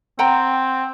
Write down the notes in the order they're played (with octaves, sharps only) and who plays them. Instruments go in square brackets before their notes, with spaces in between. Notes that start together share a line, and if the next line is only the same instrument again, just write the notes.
[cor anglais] C4 [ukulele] F#5 G5 A#5